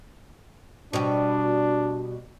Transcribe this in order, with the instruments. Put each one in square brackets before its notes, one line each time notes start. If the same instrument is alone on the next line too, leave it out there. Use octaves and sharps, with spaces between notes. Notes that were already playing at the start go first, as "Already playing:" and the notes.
[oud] B2 G3 [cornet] D4